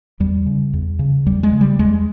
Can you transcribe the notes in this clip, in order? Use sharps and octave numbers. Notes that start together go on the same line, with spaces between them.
E2 G3
C#3
E2
C#3
E2 G3
G#3
C#3
G3
E2 G#3